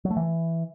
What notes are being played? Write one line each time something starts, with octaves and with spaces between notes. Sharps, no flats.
F#3
A3
E3